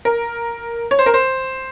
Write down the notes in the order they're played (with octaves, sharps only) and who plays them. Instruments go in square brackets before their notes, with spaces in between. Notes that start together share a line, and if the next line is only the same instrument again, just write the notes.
[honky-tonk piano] A#4
C#5
C5
A#4
C5